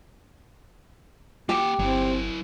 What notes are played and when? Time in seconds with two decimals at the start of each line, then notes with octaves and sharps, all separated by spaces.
1.49 A#3 G4 F#5
1.79 G1 F#3 C4 E4